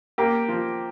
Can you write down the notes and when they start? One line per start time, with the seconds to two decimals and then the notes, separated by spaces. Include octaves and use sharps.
0.18 A#3 G4
0.49 F3